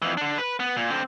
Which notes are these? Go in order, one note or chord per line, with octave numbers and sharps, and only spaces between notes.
F2 E3
D3 D4
B4
B3
A#2
D3 C4